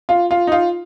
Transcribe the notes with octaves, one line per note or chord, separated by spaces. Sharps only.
F4
F4
D#4
F4